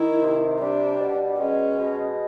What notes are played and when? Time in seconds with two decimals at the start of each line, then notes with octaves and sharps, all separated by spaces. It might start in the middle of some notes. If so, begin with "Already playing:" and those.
Already playing: D#3 E4
0.22 C3
0.61 G3 D4
1.00 B2
1.39 G#3 C#4
1.79 B2